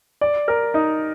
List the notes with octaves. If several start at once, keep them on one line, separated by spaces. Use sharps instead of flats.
D5
A#4
D#4